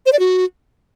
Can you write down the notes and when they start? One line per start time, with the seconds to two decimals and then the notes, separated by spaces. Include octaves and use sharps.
0.06 C5
0.12 D5
0.19 F#4